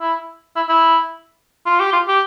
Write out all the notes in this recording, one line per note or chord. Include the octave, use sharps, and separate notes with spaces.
E4
E4
E4
F4
G4
F4
G4